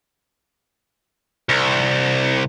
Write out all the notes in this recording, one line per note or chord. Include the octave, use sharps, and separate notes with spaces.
C2